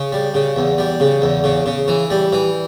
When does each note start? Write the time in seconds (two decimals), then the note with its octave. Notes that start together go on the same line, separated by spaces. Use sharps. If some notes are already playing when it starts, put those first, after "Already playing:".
Already playing: C#3
0.12 G3
0.34 C#3
0.56 E2
0.78 G3
1.00 C#3
1.22 E2
1.44 C#3
1.66 C#3
1.88 E3
2.10 G3
2.33 E3